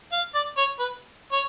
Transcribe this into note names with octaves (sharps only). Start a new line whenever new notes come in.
F5
D5
C#5
B4
C#5